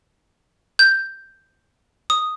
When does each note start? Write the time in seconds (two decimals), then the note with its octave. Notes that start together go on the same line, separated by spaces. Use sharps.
0.79 G6
2.10 D#6